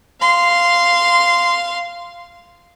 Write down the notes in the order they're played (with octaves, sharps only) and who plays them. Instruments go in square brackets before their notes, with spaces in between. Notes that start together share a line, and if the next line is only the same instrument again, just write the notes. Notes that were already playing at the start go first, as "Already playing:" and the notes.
[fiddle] F5 C6